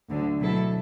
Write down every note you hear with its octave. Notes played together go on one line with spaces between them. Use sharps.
D2 D3 F#3
B2 F#3 A3 E4 A4